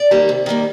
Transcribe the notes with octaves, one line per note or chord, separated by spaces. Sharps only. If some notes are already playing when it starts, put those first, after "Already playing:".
Already playing: D5
D#3 G3 A#3
C3
D#3 G3 A#3